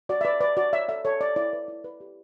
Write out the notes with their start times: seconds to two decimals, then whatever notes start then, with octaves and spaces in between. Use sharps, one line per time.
0.09 F#4 D5
0.21 E5
0.25 B4 D5
0.41 B4 D5
0.57 F#4 D5
0.73 C#5 E5
0.88 A4 E5
1.05 A4 C#5
1.21 C#5 D5
1.36 E4 D5
1.53 B4
1.68 E4
1.84 B4
2.00 G4